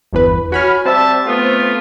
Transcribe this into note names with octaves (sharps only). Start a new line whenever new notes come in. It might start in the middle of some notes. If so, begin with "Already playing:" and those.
G1 E2 B4
E3 C#4 F#4 B5 F6
G3 C4 E5 A5
A3 B3 F4